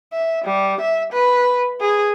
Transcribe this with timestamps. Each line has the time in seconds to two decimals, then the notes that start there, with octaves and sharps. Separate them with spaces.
0.13 E5
0.45 G3
0.81 E5
1.13 B4
1.81 G#4